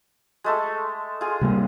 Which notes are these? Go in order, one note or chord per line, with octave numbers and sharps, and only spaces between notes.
G#3 A3 A4
F4 G#4
C3 G3 A#3